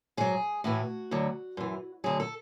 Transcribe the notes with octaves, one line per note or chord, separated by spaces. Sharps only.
G#2 F#3 G#4
A2 E3 F#4
D2 D3 F#3
F#2 E3
D2 D3 F#3 G#4
A4